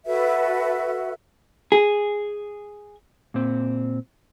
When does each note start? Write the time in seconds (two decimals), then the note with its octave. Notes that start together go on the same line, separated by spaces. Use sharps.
0.06 F#4 A4 B4 E5
1.72 G#4
3.34 A#2 C4